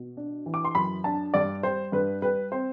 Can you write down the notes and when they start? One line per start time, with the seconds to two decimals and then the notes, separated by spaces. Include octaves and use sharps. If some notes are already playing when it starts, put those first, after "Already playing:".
Already playing: B2
0.17 D4
0.46 E3
0.54 D6
0.65 C6
0.75 F#2 B5
1.04 D4 A5
1.34 G2 D5
1.63 G3 C5
1.92 G2 B4
2.22 G3 B4
2.52 C4 C5